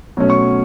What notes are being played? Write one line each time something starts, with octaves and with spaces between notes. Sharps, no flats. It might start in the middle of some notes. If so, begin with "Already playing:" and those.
B2 F#3 A3 C#4
C#6